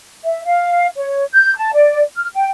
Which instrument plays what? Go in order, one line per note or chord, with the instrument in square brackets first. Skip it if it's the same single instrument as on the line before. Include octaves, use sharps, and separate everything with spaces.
[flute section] E5
F5
C#5
G6
A5
D5
F6
G5